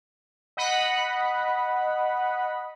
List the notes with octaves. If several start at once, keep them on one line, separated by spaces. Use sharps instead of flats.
D#5 F#5 B5